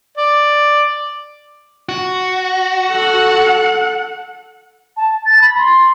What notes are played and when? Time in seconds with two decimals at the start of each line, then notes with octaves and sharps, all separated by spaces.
0.17 D5
1.89 F#4
2.91 A4 F#5
4.97 A5
5.25 A6
5.42 B5
5.58 C6